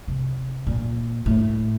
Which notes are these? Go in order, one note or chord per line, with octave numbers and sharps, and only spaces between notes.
C3
A#2
A2